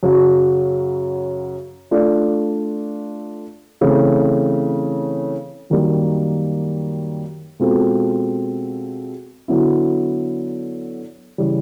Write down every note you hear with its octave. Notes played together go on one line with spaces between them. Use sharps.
F#2 C#3 F#3
A3 D4 F4 A4 D5
C#3 E3 A3 C4 E4
F#2 D#3 G3 A#3
B2 G#3 C4 F4 A4
D3 F#3 B3 E4
C#3 E3 G3